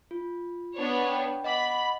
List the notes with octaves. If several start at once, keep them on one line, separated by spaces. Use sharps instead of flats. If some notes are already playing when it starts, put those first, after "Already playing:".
F4
B3 D4 C#5
G5
D#5 F#5 B5 D6